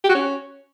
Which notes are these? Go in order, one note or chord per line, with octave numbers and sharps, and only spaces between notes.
G4
F#4
C#4